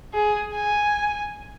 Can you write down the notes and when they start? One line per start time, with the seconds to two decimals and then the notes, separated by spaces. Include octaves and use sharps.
0.14 G#4
0.55 G#5